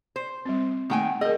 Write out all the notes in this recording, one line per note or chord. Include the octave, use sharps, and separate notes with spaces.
C5
G3 C4
D#3 A3 A#3 G5 G#5
G#4 A#4 D#5